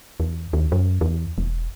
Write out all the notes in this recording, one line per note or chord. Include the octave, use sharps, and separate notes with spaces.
E2
D#2
F#2
E2
E1